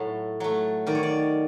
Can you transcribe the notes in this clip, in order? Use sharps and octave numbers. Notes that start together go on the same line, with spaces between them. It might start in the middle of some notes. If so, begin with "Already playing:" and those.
Already playing: A2 F#3 A3
F#3 A3
D#3 D5
C#5
D5